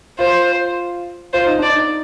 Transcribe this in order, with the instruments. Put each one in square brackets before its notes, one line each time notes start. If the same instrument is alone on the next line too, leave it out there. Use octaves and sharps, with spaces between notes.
[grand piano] F4 [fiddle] C5
[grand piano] F4 [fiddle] C5
[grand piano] D#4
[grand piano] D4 [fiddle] D5
[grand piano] D#4